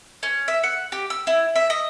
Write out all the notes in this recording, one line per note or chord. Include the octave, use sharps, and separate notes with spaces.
C#4
E5
F#5
G4
E6
E4
E5
D#5